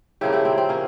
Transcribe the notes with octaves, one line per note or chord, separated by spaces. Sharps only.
C#3 F3 A#3 E4 G4
E4 G4
C4
C4
A#3 C#4